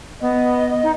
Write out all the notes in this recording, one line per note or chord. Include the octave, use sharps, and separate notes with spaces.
B3 D#5
D#4